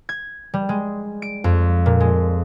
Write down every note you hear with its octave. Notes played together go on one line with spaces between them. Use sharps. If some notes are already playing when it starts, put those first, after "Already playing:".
G#6
G3
G#3
D7
F2
A#2
G#3